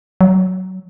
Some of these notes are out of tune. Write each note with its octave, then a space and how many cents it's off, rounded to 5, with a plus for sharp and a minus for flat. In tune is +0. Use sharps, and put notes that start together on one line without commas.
F#3 +15